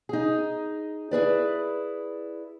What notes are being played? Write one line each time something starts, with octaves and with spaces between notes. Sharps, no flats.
D#4 G#4
E4 G#4 B4 D5